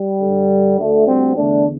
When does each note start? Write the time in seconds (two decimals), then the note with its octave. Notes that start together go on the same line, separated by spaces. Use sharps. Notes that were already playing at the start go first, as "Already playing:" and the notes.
Already playing: G3
0.21 G2 D3
0.78 D2 D3 A3
1.06 G3 C4
1.34 E2 D3 A3 D4